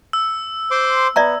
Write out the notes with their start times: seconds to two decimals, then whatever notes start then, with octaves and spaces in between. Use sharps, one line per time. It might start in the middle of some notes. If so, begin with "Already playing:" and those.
0.13 E6
0.71 C5 C6 D6
1.16 B3 D5 E5 A#5